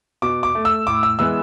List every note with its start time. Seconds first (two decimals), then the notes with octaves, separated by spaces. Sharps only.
0.22 B2 D6
0.43 D6
0.55 A3
0.65 E6
0.87 A2 D6
1.03 E6
1.19 E3 G#3 B3 E6